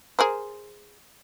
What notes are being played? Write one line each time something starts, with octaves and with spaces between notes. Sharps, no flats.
G#4 A#4 C5